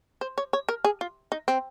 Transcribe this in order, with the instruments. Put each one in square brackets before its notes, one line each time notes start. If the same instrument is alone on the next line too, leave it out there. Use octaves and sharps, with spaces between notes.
[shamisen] C5
C#5
C#5
A#4
G#4
F4
D#4
C4